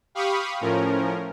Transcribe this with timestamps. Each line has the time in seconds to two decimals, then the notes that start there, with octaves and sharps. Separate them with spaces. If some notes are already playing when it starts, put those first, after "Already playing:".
0.15 G4 F5 B5 C#6 D#6
0.61 A2 F3 C#4 A#4